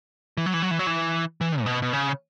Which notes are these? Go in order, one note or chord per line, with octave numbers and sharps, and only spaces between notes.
E3
F#3
E3
F#3
E3
F#3
E3
E3
G#2
B2
B2
C#3